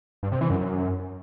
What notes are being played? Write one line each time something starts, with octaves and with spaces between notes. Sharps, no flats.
G2
C3
E3
F#2